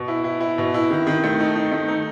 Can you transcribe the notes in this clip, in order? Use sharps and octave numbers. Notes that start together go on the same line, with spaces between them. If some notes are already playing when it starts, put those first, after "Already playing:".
Already playing: B2
E4
E4
E4
B2
E4
D#3
D#3
A3
D#4
D#4
A3
D#4